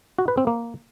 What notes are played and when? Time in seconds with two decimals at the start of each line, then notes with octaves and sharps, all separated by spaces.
0.19 F#4
0.28 B4
0.38 C4
0.47 A#3